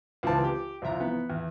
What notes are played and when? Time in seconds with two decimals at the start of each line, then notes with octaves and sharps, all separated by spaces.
0.23 C#2 E3 C4 A5
0.44 G4
0.82 C2 F2 E5 A#5
1.00 E3 B3
1.30 E2